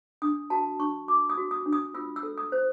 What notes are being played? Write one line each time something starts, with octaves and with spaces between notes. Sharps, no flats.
D4 D#6
F#4 A5
D4 C#6
F#4 D6
D#6
F#4
D#6
D4
D#6
F4 E6
E6
A4
D#6
C5